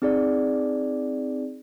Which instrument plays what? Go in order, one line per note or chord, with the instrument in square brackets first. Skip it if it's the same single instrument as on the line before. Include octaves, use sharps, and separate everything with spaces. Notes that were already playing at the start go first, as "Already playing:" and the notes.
[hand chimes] C4 D#4 G#4 D5